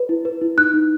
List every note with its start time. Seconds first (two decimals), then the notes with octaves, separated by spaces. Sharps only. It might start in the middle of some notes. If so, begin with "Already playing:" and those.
Already playing: B4
0.09 E4
0.25 B4
0.41 E4
0.57 D#4 F#6
0.74 D#4